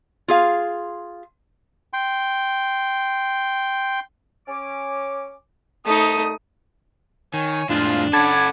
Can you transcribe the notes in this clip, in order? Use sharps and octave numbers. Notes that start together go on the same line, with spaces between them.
F4 G#4 F5
G5 C6
C#4 D6
C2 A3 D#4 D#6
D#3 C#5 G#5
F2 A2 F3 G#3 D4 F4
C#4 A4 F#5 A5 B5 D6 G#6